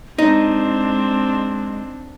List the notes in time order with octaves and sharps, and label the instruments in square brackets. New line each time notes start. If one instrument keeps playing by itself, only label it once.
[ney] G#3 [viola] C4 D4 [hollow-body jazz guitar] D#4